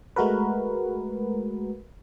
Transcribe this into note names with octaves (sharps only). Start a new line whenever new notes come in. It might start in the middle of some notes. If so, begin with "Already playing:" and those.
G#3 A3 F#4 A#4 B4